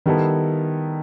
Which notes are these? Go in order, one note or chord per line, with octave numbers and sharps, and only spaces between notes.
D#3 G3 B3 E4 A4